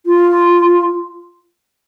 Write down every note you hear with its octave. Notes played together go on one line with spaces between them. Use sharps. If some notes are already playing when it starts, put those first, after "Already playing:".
F4